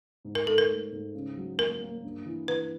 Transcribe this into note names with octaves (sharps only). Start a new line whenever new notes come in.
G#2
A#4
G#2 A4
A#4
A3
G#2
C#3
F#3
A#3 A#4
A#3
G2
E3
E3 B4